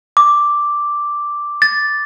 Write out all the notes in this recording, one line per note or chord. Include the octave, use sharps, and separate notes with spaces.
D6
A6